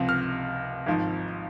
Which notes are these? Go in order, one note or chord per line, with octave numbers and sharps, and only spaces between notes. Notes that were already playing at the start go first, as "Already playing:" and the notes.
Already playing: C#2 C3 F3
F6
G#1 G#2 F3